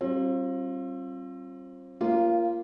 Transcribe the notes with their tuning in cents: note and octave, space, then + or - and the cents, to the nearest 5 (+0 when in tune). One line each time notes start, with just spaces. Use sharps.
G3 -45 C4 +35 F4 +0
A#3 +0 F4 -20 C#5 -40